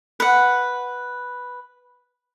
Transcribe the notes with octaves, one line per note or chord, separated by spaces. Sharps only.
B4 F#5